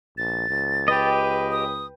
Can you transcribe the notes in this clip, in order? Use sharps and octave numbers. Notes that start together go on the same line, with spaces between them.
A#1 A6
C#2
G4 B4 D#5 G5
D#6